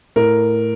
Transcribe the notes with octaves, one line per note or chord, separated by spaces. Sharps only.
A2 A#4